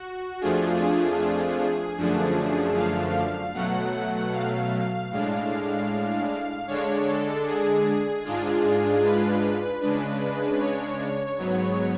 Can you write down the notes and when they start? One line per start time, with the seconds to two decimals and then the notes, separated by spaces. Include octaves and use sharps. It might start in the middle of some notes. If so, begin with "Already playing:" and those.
Already playing: F#4
0.41 F2 F3 A3 D4 F4 G#4
0.80 G#4
1.98 F#2 D3 F3 A3 D4
2.76 F5
3.54 B2 F#3 A3 F#5
4.33 F5
5.11 A2 G#3 D4
6.68 D3 G#3 D4 C#5
7.07 A4
7.46 G#4
8.24 G#2 G#3 D4 F4
9.03 B4
9.81 C#3 G#3 D4
10.59 C#5
11.38 G#2 F#3 B3